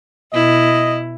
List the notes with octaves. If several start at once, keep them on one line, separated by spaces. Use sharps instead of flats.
B2 E4 D#5